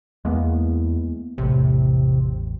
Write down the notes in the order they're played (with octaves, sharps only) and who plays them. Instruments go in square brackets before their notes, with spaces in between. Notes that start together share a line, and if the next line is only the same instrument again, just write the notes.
[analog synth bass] E2 [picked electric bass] G#3 A#3 B3
[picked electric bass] A1 E2 A2 [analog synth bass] C3